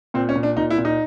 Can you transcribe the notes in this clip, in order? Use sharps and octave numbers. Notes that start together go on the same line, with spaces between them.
A#2 C4
C#4
A#2
D4
A#2 D#4
E4
A#2
D#4